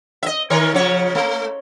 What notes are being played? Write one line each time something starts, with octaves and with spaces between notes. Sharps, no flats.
D#5 E5
D#3 A#4 C#5
C#3 F3 C#5
A3